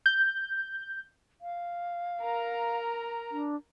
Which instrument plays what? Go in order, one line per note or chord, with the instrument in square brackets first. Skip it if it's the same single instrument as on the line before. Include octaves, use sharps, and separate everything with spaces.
[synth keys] G6
[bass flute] F5
[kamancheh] A#4 A#5
[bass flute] D4